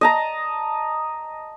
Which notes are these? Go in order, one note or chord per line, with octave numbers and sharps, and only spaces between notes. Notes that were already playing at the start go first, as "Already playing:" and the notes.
D#5 A5 A#5